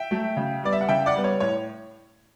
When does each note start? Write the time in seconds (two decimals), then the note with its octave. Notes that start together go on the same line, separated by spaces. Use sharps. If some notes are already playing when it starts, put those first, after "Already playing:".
Already playing: E5 G5
0.11 F#3 A3
0.37 C#3
0.64 G3 B3 D5
0.73 E5
0.81 F#5
0.89 C#3 E5 G5
1.06 D5 F#5
1.16 G3 B3
1.24 C#5
1.40 A2 C#5